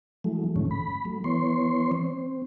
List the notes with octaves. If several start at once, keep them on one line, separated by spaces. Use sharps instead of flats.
E3 F#3 G#3 A3
G#2 D3 E3 A3 C#4
B5
F#3 A3
E3 B3 C#5 C6
C4